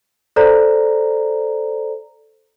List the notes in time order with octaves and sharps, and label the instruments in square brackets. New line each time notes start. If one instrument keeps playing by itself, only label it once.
[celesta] A4 C5 D5 A#5